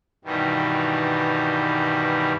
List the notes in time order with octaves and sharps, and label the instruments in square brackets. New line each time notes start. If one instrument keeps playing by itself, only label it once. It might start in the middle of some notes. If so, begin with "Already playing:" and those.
[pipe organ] G2 B2 D#3 E3 G3